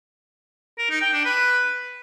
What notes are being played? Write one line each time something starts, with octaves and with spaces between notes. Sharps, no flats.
A#4
D#4
G5
D4
B4